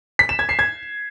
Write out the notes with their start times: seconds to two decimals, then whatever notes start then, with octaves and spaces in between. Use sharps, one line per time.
0.19 B6
0.29 E7
0.39 G#6
0.49 C7
0.59 G#6